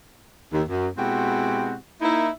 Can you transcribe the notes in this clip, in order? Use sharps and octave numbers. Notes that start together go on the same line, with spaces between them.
D#2
F#2
B2 G#3 C4 E4 F#4 G4
A#3 D#4 E4